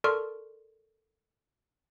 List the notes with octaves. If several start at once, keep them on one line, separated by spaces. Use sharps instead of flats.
A4 A#4 D5 C6 C#6 F6